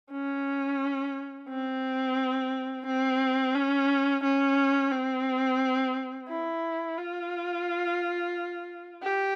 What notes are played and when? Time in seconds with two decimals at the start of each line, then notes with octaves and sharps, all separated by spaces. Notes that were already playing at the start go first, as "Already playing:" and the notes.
0.12 C#4
1.49 C4
2.86 C4
3.55 C#4
4.23 C#4
4.92 C4
6.29 E4
6.98 F4
9.03 G4